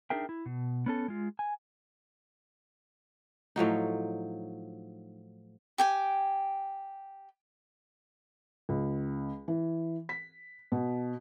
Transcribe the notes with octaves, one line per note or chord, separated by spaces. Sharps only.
D4 D#4 G#4 A#4 E5 G5
E4
B2
B3 C#4 A4
G#3 F4
G#5
A2 F3 F#3 D#4
G4 G5 G#5
C#2
E3
B6
B2